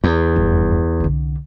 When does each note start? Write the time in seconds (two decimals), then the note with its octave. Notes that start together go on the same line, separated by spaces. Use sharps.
0.04 E2
0.36 F1 G2
1.00 C2 D3